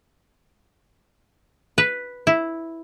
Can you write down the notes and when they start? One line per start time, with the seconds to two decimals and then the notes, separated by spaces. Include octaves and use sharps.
1.78 B4
2.27 E4